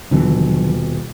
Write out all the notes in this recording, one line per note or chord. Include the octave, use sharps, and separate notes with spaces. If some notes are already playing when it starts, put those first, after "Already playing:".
D#1 B2 D3 E3 F#3